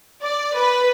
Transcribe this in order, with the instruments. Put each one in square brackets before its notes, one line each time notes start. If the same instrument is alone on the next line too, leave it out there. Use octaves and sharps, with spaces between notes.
[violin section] D5
B4